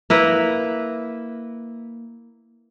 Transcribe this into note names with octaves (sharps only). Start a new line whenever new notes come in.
A#3 E4 B4